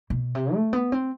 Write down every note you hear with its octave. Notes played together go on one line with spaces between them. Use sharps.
B2
C3
A3
B3
C4